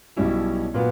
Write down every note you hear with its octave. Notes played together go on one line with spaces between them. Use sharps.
B1 B2 G3 C#4 E4
A#2 F#3 B3